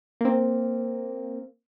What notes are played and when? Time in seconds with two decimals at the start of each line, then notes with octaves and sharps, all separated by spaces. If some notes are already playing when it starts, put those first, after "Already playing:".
0.21 A#3 C4